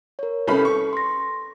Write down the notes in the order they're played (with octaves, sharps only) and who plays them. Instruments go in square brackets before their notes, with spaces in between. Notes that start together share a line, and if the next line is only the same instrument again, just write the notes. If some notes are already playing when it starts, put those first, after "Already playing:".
[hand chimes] A#4 C#5
[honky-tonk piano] C2 C#4 B5 [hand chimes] A4 B4
[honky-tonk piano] C#6
[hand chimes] C6 A#6